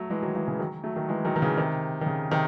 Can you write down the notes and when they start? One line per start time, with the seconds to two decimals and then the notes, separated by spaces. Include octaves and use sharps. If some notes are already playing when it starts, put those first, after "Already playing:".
Already playing: F#3 A3
0.10 E3 G#3
0.23 D#3 F#3
0.35 E3 G#3
0.47 C#3 E3
0.59 D#3 F#3
0.84 F#3 A3
0.96 D#3 F#3
1.09 E3 G#3
1.25 D#3 F#3
1.36 D#3
1.42 C#3 E3
1.58 C3 D#3
2.01 D#3
2.06 C#3
2.31 C3 D#3